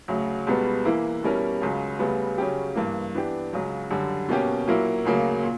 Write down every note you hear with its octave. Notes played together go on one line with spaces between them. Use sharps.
D2 C#3 F#3
C#2 B2 G3 B3
E3 A#3 E4
B2 G3 C#4 E4 A#4
C#2 C#3 F#3
D2 C#3 G3 B3
C#3 F#3 C#4 G4
G2 E3 A#3
E3 B3 D4 G4
C#2 C#3 F#3
F#2 D3 G3
B2 A#3 C#4 G4
A#2 F#3 A#3 E4 A#4
D2 C#3 F#3 A#3
A#2